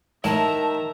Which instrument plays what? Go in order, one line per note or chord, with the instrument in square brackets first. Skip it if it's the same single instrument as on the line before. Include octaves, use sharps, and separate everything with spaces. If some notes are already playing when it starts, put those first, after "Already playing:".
[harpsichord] A2 [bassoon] D#3 [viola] E5 A#5 [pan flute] A5